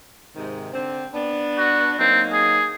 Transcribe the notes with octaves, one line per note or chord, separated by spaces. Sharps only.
G#2 C3 D#3
D3 C4
B3 D4
F#4
F#3 A#3 C4 D#4
G#4